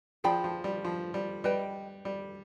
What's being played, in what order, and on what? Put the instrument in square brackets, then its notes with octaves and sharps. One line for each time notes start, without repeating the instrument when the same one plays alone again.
[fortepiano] F3 [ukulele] G#4 D5 G5 B5
[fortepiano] F3
G3
F3
G3
[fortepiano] G3 [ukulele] B4 D#5 G5
[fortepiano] G3